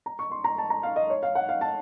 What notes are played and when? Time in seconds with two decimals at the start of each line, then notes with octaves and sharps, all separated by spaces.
0.06 A#5
0.19 C#6
0.31 C6
0.44 A#5
0.58 A5
0.70 A#5
0.83 F5
0.96 D#5
1.10 C#5
1.23 F5
1.35 F#5
1.49 F5
1.61 A5